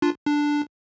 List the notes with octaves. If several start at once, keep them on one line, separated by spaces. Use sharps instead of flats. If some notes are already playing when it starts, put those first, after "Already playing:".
D4 F4
D4